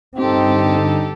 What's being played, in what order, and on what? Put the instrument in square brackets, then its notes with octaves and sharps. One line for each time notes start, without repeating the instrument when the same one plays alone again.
[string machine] G2 D3 [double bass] C4 [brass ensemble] D#4 [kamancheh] G4 A4